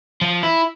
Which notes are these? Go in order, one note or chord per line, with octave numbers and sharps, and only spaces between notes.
F3
E4